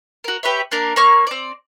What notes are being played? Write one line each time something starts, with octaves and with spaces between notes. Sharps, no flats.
F#4 A#4
G4 B4 C#5 E5
A#3 D4 A#4
A#3 C#5 C#6 F6
C4 D5